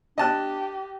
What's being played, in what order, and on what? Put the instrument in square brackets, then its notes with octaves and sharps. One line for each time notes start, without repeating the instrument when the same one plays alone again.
[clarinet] D4 [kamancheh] G4 [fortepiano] D#5 A5 F#6